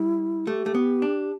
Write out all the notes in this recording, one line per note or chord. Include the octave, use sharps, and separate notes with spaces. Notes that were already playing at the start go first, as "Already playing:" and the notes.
Already playing: G3 E4
A3 G4
A3
B3
D4